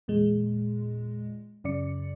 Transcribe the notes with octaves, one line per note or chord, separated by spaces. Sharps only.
E2 A#2 G#3
F#2 C#3 D5 C#7